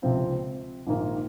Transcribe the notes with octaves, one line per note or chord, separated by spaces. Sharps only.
C#2 C3 F3 C4 F4
A#1 G#2 D#3 A#3